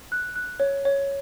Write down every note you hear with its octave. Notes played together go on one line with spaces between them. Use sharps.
F#6
F#6
C#5
C#5